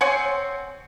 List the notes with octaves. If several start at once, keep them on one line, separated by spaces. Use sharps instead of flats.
C4 C#5 F#5 G#5